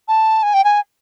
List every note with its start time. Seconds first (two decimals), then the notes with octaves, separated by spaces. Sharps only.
0.08 A5
0.43 G#5
0.54 G5
0.64 G#5